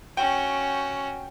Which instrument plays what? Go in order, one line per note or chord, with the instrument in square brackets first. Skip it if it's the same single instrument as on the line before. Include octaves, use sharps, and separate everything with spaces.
[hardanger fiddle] C#4 F#4 [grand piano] G5